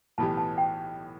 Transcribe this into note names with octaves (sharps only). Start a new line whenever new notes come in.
B1 A2 E3 B3 G4 A5
A5
G5